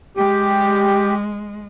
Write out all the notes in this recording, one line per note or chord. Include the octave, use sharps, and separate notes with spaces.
G#3 G4